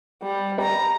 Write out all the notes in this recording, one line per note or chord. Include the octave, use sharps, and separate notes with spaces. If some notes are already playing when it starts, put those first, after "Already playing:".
G3
A#5